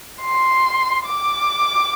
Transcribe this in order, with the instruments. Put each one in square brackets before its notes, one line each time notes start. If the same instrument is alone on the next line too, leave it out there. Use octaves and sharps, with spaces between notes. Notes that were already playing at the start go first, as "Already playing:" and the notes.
[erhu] C6
D6